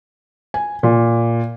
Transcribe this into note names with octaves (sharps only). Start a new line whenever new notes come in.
G#5
A#2